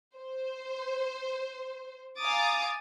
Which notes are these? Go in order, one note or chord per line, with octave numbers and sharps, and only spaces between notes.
C5
F5 G#5 A#5 D6 D#6 A6